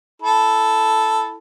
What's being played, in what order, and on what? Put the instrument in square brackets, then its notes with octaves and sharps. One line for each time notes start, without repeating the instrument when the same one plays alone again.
[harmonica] E4 A4